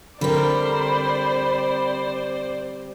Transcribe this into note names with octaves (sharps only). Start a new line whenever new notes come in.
D3 G3 C4 A#4 C5 D5 B5